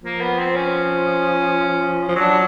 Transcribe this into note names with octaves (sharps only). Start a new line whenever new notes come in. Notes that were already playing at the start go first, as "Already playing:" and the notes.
F3 A#3
B3
C4
C#4
F3
F#3 D4